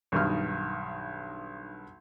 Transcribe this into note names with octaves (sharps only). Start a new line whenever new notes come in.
B1 G2 D#3 F6